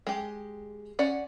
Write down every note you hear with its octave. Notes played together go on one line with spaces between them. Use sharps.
G#3 G4
C#4 D5 F#5